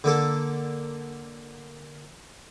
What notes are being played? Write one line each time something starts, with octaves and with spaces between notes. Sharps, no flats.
D3 A#3 A4